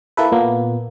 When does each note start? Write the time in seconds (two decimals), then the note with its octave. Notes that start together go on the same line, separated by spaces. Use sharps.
0.17 A#3 E4 A4 B4
0.32 A#2 A#3 B3